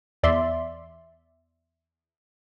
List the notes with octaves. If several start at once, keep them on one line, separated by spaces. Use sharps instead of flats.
E2 D5 E5 C6